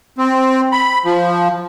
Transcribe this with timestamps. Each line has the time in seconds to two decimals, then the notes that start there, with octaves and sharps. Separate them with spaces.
0.18 C4
0.72 B5
1.05 F3